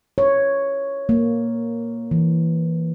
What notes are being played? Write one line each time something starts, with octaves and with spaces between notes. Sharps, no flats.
C#5
A#3
E3